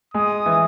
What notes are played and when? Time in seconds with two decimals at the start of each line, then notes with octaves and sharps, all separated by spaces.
0.14 G#3 D#6
0.46 E3